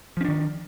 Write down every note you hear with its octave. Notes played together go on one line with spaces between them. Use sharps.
D#3 F3 C#4 D4